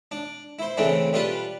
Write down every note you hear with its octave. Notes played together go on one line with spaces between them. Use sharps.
D4
E4 C5
C#3 E3 A3 C4 D4 E4
G3 D4 F4 B4 A5